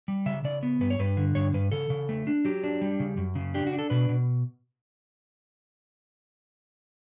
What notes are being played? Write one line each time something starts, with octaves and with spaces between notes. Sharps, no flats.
G3
C#3 E5
C#3 D5
B3
G2 B4
C#5
G2 B4
D3
G2 C#5
G2 B4
C#3 A4
C#3
A3
D4
F#3 G4
D4
G3
C#3
F#2
C#3
D4 G4
F#4
D4
A4
B2 B4
B2